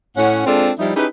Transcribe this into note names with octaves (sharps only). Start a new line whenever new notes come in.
A2 C#4 F#5
G#3 C4 D4 F4 G#4 A4
F3 G3 D#4 E4
C#4 D#4 E4 G4 G#4 B4